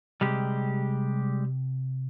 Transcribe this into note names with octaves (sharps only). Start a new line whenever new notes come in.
C3 G3 G#3 G4